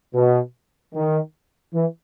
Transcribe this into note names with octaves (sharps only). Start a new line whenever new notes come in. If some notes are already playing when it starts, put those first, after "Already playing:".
B2
D#3
E3